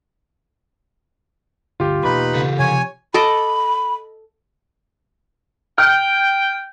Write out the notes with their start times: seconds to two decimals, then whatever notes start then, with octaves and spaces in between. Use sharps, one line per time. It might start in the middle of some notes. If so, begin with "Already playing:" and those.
1.80 G1 D2 D3 F4 G4
2.04 E1 B2 A#3 D#4 B4 B5
2.35 C#3 A4
2.59 C3 F3 C#5 G#5
3.14 A4 D#5 B5 D6
5.78 G5 F6